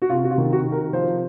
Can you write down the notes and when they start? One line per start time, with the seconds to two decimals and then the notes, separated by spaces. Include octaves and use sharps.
0.02 F#4
0.10 C3 F4
0.24 F#4
0.31 F4
0.38 D#3
0.52 F#4
0.65 C3
0.72 A#4
0.93 F3 C5